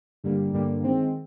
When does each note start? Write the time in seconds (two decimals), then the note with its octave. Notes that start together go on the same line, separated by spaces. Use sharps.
0.24 G2 D3 G3 A#3
0.53 G2 D3 G3 A#3
0.83 D#3 G#3 C4